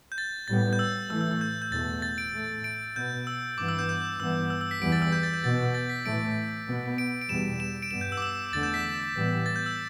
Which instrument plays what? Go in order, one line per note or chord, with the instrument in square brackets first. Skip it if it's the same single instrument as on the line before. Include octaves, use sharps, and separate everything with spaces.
[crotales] G6
A6
[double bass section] A2 G3 B3 [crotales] A6
[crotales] G6
E6
[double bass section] A2 E3 A3 [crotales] E6
[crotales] E6
E6
G6
G6
[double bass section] E2 B2 A3 [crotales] A6
[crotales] A6
D7
[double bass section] A2 A3
[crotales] D7
[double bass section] B2 B3 [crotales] G6
[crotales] E6
[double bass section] G2 E3 B3 [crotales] D6
[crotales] E6
G6
G6
[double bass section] G2 E3 B3 [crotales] E6
[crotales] E6
E6
B6
[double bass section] E2 E3 G3 B3 [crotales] D7
[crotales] A6
E6
G6
A6
G6
[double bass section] B2 B3 [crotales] A6
[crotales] A6
B6
[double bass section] A2 E3 A3 [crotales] D7
[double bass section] B2 B3
[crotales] D7
D7
[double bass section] E2 B2 G3 B3 [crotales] E7
[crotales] E7
D7
[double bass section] G2 G3 B3 [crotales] E7
[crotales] G6
E6
D6
E6
[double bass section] E2 D3 A3 [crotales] A6
[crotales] G6
B6
[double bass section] A2 E3 G3 B3
[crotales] A6
G6
E6